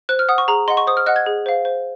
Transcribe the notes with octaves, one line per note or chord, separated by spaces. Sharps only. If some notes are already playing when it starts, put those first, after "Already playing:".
C5 F#6
F6
F#5 D#6
C#6
G#4 A#5
D#5 F#5 C6
C#6
C5 D#6
F6
D#5 F#5 F#6
G#6
G#4
C5 F5
C5